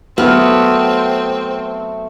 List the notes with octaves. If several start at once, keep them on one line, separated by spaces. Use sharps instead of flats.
F#3 A3 B3 C4 F6